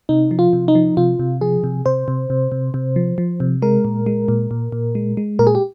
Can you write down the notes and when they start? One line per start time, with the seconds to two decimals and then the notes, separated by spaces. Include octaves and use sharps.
0.09 C3 D#4
0.31 F3
0.39 F4
0.53 C3
0.68 D#4
0.75 F3
0.97 C3 F4
1.19 C3
1.41 F3 G#4
1.64 C3
1.86 C3 C5
2.08 C3
2.30 C3
2.52 C3
2.74 C3
2.96 F3
3.18 F3
3.40 C3
3.62 G#3 A#4
3.85 A#2
4.06 G#3
4.28 A#2
4.51 A#2
4.72 A#2
4.95 G#3
5.17 G#3
5.39 A#2 A#4
5.47 G#4
5.55 G4